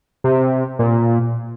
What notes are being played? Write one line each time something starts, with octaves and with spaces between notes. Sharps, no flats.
C3
A#2